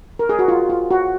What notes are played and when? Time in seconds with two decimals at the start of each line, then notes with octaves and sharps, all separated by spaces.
0.19 A#4
0.29 G#4
0.39 F#4
0.48 F4
0.70 F4
0.91 F#4